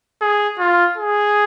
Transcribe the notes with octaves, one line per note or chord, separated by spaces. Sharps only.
G#4
F4
G#4